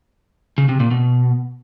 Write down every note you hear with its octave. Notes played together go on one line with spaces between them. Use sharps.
C#3
C3
A#2
B2